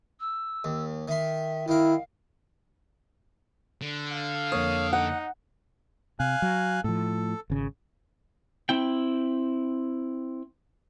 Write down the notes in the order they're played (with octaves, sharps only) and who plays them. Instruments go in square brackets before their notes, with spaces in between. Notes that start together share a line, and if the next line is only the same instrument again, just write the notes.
[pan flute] E6
[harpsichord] D#2
[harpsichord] D#3 C6 [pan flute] E5
[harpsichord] D#3 A#4 [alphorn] E4 [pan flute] F5
[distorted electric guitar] D3
[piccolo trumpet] F5
[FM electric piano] F2 A#3 D#6 [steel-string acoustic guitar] C#5
[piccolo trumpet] D#4 [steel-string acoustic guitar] F#5
[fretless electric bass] C3 [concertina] F5 G#5 F#6
[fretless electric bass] F#3
[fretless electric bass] A2 F3 [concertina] A4
[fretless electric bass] G#1 C#3
[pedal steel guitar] C4 E4 G5